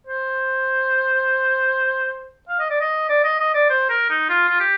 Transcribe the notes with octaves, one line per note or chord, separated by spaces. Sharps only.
C5
F5
D#5
D5
D#5
D5
D#5
D#5
D5
C5
A#4
D#4
F4
F4
G4